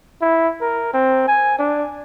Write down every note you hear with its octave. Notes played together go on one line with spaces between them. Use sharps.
E4
A#4
C4
G#5
D4